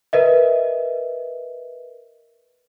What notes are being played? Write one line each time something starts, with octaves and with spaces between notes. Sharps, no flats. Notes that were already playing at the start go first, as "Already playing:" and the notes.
A#4 B4 D#5 E5